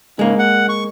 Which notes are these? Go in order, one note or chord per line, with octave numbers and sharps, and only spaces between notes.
G#2 C#3 G#3 A#3
F#5
C#6